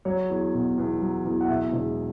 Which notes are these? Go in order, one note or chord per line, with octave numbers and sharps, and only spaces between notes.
F#3 C#5
E2
B2
E2
F#3
E2
F#5
B2 E5
E1